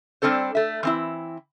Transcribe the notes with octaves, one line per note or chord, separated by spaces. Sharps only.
G3 C4 D4 A4 C5
A3 E5
E3 C4 E4